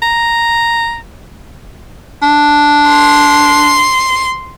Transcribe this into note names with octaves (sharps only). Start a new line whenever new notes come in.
A#5
D4
C6